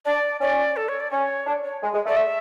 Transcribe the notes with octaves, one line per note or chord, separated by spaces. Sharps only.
D4 D5
C#4 D5
A4
C#5
D5
C#4 C#5
D4
C#5
G#3
G#3
A3 D5
E5